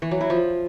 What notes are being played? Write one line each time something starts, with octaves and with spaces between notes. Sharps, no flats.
E3
F#3
E4
F3